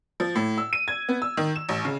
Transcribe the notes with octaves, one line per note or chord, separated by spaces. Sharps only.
F3
A2
E6
D#7
G#6
B3
E6
D#3
E7
A1
C#3